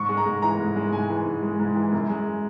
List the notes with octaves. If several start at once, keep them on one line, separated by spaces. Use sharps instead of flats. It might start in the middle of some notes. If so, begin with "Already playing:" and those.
Already playing: G#2 C#6
G#3
A#5
G#2
E3 A#5
G#2
G#3
G#2 G#5
E3
G#2
G#3
G#2
E3
F#2
G#3